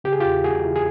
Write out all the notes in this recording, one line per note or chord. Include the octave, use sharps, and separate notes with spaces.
C#3 G4
G#4
E2 F4 G4
E3 F#4 G#4
E3
G#4